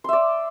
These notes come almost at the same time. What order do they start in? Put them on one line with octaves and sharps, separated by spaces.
C6 E5 D5